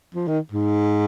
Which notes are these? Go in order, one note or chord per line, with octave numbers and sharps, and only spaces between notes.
F3
D#3
G#2